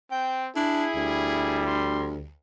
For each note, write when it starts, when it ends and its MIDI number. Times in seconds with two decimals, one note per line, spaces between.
0.11 0.50 60
0.11 0.44 79
0.56 0.86 62
0.56 1.78 64
0.56 1.66 68
0.95 2.32 38
0.95 2.28 55
1.66 2.12 84